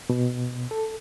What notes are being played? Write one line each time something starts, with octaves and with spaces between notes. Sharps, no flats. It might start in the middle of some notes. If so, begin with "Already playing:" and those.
B2
A4